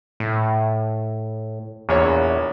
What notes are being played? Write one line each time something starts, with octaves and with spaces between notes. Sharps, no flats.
A2
A#1 E2 C#5